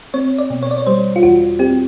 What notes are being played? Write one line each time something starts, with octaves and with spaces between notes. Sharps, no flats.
C4 C#5
D5
B2
C#5
D5
C#5
G3 C5
F4
E2 F#4
C4 G4